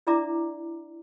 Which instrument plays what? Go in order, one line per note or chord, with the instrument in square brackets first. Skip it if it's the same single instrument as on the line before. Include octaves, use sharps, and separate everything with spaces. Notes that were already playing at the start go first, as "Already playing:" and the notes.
[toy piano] D4 E4 D5 E5 A#5 D6